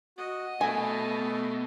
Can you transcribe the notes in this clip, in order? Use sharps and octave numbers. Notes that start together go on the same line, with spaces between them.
F#4 D#5
B2 A3 G#5